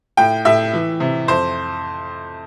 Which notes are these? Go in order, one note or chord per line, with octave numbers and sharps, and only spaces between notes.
A2 G5
A2 E5
E3
C3
F2 C5